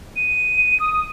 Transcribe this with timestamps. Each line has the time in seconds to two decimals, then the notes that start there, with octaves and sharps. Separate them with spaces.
0.16 D#7
0.80 D#6